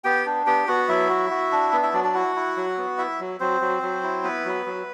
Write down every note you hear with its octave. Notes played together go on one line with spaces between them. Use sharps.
B3 G4 G5
D4
B3 G4 G5
B3 F#4 F#5
F#3 E4 E5
F#4
F#4
D4
B3
E4 E5
F#3 D4 D5
D4 D5
E4 F#4 F#5
E4
F#3
B3
E4 E5
F#3
F#3 C4 C5
F#3
F#3
E4
B3 B4
F#3
F#3